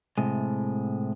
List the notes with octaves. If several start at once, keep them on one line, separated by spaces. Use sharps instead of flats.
A2 C3 G#3